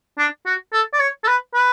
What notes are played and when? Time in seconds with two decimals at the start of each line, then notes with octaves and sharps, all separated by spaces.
0.19 D4
0.46 F#4
0.73 A4
0.93 D5
1.00 C#5
1.24 A4
1.28 B4
1.54 B4